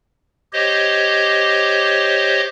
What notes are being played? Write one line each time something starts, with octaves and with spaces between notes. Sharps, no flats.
G4 C5 C#5 D#5